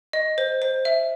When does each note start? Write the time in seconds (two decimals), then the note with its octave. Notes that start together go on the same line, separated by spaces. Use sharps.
0.13 D#5
0.38 C5
0.62 C5
0.85 E5